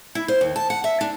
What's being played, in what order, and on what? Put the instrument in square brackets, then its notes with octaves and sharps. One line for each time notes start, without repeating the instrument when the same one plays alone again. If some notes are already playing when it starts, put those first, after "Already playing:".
[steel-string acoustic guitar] E4
C5
D#2
A5
F#5
E5
D4